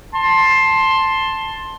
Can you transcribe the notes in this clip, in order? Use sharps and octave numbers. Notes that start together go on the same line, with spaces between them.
A5 C6